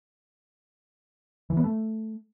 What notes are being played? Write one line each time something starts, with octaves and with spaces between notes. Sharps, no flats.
E3
B3
A3